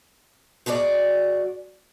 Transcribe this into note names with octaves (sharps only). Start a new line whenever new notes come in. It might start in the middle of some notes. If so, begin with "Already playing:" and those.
G#2 F#4 G#4 A4 D5